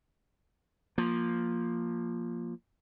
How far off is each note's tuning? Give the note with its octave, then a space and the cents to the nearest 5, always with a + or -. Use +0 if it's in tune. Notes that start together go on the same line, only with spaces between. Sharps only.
F3 +0 A#3 +0